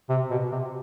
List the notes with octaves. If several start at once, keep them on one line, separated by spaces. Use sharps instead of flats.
C3
B2
C3